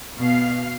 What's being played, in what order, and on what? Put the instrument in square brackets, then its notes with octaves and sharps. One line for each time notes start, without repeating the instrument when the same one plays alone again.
[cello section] B2 B3 F5